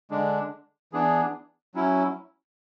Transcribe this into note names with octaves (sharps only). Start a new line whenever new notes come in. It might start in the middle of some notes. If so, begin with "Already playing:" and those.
D3 G#3 D4
E3 B3 D4 G#4
F#3 C#4 E4